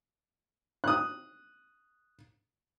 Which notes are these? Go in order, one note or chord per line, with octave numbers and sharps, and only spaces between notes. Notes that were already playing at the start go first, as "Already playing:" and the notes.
D#6 F#6